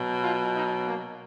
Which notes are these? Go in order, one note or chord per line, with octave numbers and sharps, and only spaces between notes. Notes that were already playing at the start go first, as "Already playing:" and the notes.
Already playing: B2 F#3
F4
D#4
A#3